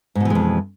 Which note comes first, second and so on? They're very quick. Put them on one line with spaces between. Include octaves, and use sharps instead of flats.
G#2 B2 E3 G#3 F2